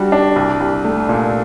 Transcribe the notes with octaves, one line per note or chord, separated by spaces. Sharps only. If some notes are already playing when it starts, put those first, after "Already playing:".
Already playing: G3 D4 F#4
D4
C2
C2
A3
A#2